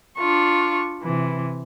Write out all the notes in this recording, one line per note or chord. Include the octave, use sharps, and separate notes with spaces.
D4 F4 C#6
C3 E3